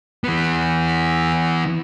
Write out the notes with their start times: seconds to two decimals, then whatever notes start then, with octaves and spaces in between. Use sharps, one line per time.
0.24 E3 B3